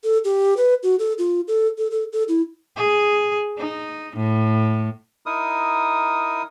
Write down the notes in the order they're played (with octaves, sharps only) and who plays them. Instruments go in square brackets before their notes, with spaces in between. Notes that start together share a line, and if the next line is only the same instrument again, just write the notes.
[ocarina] A4
G4
B4
F#4
A4
F4
A4
A4
A4
A4
E4
[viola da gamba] G#4
D#4
A2
[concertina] D#4 E4 A#4 D#6